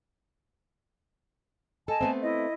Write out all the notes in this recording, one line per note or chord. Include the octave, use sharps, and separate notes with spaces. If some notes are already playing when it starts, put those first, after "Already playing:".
A4 D#5 G#5 A5
A3 B3 C4
E4 D#5